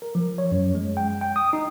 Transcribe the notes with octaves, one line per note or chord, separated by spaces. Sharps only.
A#4
F3
C#5
F#2
G#3
G5
G5
D#6
D#4